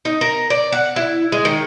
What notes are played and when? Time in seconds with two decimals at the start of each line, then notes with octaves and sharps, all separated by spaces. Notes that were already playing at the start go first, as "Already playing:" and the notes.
0.05 D#4
0.21 A#4
0.50 D5
0.72 F#5
0.96 E4
1.32 G#3
1.45 D#3